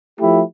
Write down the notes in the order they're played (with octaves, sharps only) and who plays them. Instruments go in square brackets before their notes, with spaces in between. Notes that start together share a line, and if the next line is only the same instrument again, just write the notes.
[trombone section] F3 A3 E4 G4